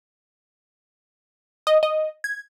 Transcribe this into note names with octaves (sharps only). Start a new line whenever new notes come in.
D#5
D#5
G#6